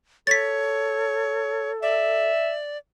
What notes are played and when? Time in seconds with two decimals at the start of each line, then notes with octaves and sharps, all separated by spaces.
0.27 A4 C#5 A6 B6
1.82 D5 E5